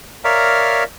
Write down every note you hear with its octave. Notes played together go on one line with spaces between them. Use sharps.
A#4 C#5 D5 E5 F5 A#5